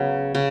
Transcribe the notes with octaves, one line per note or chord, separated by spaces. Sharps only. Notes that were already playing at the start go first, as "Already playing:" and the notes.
Already playing: C#3 F#3 B3 A#4
C#3